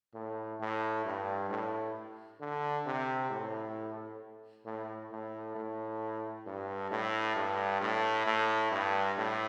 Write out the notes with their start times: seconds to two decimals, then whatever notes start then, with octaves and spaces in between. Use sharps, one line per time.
0.14 A2
0.60 A2
1.05 G2
1.50 A2
2.40 D3
2.86 C3
3.30 A2
4.65 A2
5.11 A2
5.55 A2
6.46 G2
6.91 A2
7.36 G2
7.81 A2
8.27 A2
8.71 G2
9.17 A2